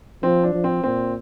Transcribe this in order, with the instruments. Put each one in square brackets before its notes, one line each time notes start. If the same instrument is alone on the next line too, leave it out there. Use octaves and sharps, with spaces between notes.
[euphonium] F3 [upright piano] C4
[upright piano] D4
[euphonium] F3
[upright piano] C4
[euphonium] A#2 [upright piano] C4